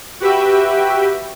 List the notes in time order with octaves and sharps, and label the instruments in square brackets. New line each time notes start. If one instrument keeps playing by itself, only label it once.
[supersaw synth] F#4 G4 B4 E5 G5